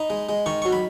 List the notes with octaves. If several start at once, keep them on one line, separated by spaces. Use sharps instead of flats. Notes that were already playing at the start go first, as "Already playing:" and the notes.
Already playing: D#4 B5
G#3
G#3
D#3 C#6
F#3 C#6
B5